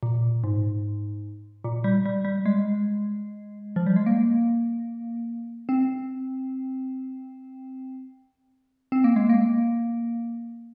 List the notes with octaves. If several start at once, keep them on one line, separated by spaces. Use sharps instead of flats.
A#2
G#2
A#2
G3
G3
G3
G#3
F3
G3
G#3
A#3
C4
C4
A#3
G#3
A#3